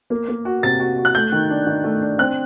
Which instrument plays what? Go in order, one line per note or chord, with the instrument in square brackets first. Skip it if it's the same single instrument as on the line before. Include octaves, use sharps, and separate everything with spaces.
[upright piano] A#3
A#3
F#4
[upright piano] C3 [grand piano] A6
[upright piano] F#4
F#4
[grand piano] F#6
[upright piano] A3 [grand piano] G6
[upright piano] D#3
D4
D#3
A3
D4
[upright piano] C4 [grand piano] F#6